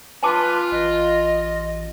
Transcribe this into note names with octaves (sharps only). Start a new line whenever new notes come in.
F4 B4 G#5 A5 D6
A1 D#5